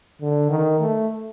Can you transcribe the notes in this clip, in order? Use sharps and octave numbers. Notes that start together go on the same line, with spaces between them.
D3
D#3
A3